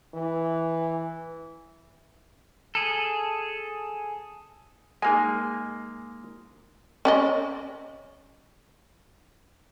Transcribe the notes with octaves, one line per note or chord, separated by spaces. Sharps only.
E3
G#4 A4
G#3 A#3 D#4 G#4 G#5
C#4 D5 D#5